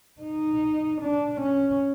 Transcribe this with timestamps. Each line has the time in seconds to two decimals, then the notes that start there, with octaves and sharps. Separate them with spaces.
0.22 D#4
1.02 D4
1.41 C#4